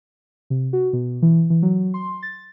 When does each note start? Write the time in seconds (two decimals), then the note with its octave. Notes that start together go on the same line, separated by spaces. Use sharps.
0.50 C3
0.73 F#4
0.93 B2
1.22 E3
1.50 E3
1.62 F#3
1.94 C6
2.23 A6